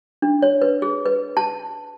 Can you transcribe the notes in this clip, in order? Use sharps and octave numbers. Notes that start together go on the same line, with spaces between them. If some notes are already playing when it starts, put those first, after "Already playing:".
D4
C#5
B4
G#4
B4
A5